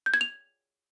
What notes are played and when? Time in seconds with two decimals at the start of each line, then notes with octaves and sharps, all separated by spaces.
0.06 G6
0.14 G#6
0.21 F7